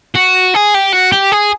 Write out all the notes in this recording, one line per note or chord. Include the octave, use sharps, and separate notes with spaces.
F#4
G#4
G4
F#4
G4
G#4